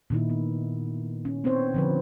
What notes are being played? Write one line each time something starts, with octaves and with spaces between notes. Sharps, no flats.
A#2 D#3 D#4 E4
B3
C#4
B3 C4 D#4 C5 C#5
D3 F3 B4